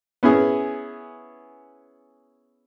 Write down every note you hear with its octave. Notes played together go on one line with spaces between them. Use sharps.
B3 C#4 E4 G#4